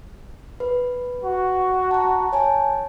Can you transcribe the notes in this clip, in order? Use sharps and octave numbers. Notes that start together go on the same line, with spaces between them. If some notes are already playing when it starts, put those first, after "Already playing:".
B4
F#4
A5 A#5
C#5 G#5 A5